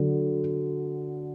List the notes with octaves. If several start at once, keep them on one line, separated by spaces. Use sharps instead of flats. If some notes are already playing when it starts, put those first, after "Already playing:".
Already playing: D3 F#3